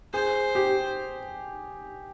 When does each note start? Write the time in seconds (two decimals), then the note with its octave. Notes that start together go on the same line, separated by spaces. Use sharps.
0.13 G#4 C5
0.55 G4